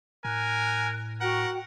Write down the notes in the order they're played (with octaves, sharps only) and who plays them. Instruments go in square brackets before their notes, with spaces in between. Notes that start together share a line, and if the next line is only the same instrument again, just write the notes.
[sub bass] A2 [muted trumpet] A#4 [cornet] G#5 [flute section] F#6
[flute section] F#4 G5 [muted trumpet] A#4 [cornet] F#5